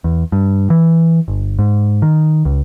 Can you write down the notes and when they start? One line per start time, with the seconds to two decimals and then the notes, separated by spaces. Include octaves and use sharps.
0.04 E2
0.32 G2
0.70 E3
1.28 G1
1.59 G#2
2.02 D#3
2.45 C#2